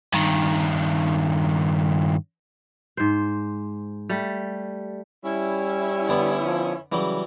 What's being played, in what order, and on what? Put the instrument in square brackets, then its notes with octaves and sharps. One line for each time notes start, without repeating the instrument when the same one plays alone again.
[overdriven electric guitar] G2 D#3
[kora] G#2 C5
G3 A3
[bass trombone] G3 [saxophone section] C#4 E4
[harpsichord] D3 B3
[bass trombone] F3
[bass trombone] C#3 [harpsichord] E3 F#3 G3